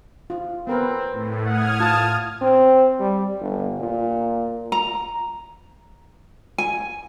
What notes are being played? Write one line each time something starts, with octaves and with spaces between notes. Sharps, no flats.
F4
B3 C4 A#4 B4
A2
F#5 D#6 F6 G#6
F4 A5
C4
G3
G1
A#2
A#5
G#5